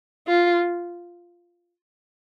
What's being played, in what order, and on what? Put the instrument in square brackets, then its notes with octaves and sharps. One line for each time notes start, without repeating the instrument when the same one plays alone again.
[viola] F4